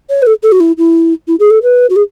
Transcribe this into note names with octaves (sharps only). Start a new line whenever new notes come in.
C#5
B4
A4
A4
F#4
E4
E4
E4
G#4
A4
B4
F#4
G#4